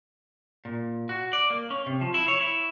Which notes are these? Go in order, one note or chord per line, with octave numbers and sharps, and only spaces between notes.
A#2
F#4
D5
A#3
C#4
C3
F3
E4
C#5
E4